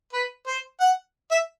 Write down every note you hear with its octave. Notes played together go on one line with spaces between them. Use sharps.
B4
C5
F#5
E5